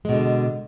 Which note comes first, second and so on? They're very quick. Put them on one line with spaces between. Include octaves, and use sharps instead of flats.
G#3 B2 D3